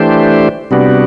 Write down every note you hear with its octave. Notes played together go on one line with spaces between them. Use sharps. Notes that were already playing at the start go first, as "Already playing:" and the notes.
Already playing: E3 A3 D4 G4 C5
C3 G3 B3 D4 F#4